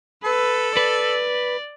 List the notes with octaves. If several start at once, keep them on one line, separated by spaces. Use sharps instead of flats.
A4 B4
B4 D5